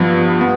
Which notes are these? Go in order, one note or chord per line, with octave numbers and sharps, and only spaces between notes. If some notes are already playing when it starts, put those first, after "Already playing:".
Already playing: G2 F3 B3
B3